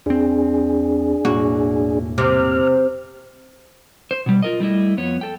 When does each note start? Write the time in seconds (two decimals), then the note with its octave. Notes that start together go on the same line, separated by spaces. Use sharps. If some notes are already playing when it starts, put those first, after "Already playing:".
0.06 E2 C4 D4 G#4
1.25 E1 A2 A#3 F#4
2.18 C3 F6
4.11 C5
4.26 B2 G3
4.43 F4 A#4 D#5
4.60 G3 A3 E4 D#5
4.97 F2 B3 C#5
5.21 A4 G5